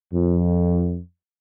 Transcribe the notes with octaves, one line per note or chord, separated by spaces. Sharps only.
F2